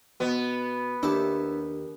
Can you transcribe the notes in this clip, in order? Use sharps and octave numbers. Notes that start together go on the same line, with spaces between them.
B2 B3
D#2 D4 E4 G4 A5